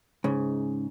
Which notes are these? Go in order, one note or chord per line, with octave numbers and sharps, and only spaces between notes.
G#2 C#3